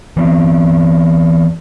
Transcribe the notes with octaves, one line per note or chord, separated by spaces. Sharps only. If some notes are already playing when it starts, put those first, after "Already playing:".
E3 B3 C4